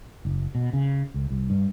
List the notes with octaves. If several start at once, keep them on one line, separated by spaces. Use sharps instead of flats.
F#1
B2
C#3
C#2
C2
G2